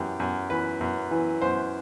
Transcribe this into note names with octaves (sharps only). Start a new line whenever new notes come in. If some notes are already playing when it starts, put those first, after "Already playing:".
Already playing: F#2 E3 G4
F#2
E3 B4
F#2
E3
F#2 C5